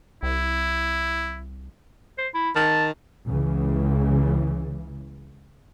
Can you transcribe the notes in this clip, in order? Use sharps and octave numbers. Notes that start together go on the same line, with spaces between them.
C2 E4
C5
E4
D#3 A5
C#2 C#3 E3